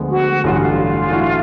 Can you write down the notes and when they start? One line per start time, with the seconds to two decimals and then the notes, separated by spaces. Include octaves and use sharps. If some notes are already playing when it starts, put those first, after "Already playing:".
Already playing: D2 D3 F3 G#3 B3
0.10 F#4
0.44 A1 G2 D3 F#3 F4
0.52 F#4
0.59 F4
1.10 A2 E3 A3 D4 F#4